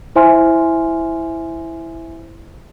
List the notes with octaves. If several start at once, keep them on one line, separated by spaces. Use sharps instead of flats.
E4 C5 E5 G#5 C6 F6